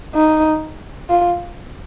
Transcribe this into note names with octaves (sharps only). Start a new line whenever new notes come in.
D#4
F4